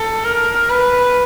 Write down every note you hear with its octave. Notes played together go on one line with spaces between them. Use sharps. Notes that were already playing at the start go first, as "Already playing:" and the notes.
Already playing: A4
A#4
B4